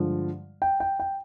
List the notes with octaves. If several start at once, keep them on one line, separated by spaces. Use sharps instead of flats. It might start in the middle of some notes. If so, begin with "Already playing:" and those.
Already playing: G2 D3 F3 G#3
G5
G5
G5